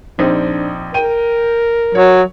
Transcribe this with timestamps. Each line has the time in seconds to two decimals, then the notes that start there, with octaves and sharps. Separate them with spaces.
0.19 A#1 C4 D4 D#4
0.94 A#4 G5 D#7
1.95 F#3 C#5